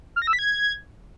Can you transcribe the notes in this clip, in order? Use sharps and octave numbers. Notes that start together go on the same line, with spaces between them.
F6
A#6
E6
B6
G#6